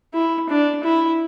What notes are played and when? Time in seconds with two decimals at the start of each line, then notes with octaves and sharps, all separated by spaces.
0.14 E4
0.49 D4
0.84 E4